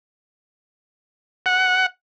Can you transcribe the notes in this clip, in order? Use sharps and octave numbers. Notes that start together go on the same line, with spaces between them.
F#5